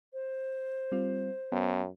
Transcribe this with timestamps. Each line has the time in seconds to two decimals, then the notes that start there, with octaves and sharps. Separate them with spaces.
0.13 C5
0.92 G3 C4 F4
1.52 F#2 B3